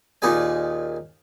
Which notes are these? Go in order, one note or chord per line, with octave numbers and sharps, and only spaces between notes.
D#2 A#2 D#4 G#4 D5 G#5